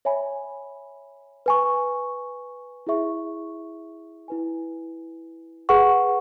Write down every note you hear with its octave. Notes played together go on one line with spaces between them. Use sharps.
C#5 E5 G#5 B5
B4 G#5 C#6
E4 G#4 E5 C#6
E4 B4 G#5
G#4 B4 F#5 C#6